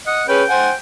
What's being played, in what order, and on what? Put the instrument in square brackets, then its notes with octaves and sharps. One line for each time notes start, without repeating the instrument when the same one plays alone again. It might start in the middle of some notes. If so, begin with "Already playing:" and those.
[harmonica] D#5 [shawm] F#5
[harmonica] C#4 G#4 B4 [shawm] G5
[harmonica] C5 F#5 G#5